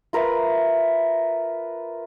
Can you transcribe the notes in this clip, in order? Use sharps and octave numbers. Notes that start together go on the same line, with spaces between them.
F4 A#4 B4 E5